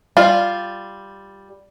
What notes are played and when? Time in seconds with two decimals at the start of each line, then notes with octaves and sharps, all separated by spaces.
0.17 G3 F4